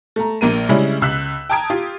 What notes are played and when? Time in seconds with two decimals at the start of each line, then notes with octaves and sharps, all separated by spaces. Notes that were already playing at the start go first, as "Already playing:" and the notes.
0.16 A3 A#5
0.41 A#1 A#3 A#4 D#7
0.69 C#3 G3 G#3 C#4 E4
1.02 C#2 E6 F#6 B6
1.49 G5 A5 A#5 D#6 G#6 D7
1.70 F4 G4